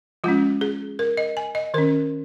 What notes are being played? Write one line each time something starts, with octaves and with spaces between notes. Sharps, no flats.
F3 G#3 C#4 F4
G#4
A#4
D#5
G#5
D#5
D#3 C#4 A#4